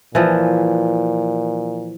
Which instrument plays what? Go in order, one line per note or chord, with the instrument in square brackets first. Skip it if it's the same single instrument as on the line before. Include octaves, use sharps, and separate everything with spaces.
[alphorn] A#2 [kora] E3 F3